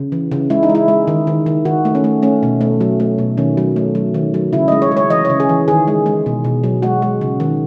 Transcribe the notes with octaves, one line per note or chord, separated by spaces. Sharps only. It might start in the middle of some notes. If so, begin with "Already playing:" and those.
Already playing: C#3
E3
C#3
G#3 E4
D#4
G#3
E4
G#3
D#3
D#3
D#3
D#3 F#4
A3
C#4
A3
A3 C#4
B2
A3
F#3
A3
B2
D#3 C#4
F#3
A3
F#3
D#3
F#3
C#3 E4
D#5
G#3
C#5
G#3
C#5
E3 D#5
C#5
C#3
G#4
E3
D#3 G#4
G#3
G#3
B2
B2
F#3
G#3 F#4
G#3
C#3
D#3